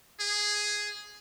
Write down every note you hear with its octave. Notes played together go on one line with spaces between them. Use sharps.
G#4